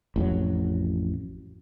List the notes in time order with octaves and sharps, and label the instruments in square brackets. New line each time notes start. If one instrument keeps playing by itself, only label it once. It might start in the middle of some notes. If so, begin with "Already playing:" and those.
[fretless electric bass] A1 F2 F#3